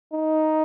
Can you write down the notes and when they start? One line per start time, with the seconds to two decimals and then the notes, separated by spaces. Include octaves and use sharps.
0.13 D#4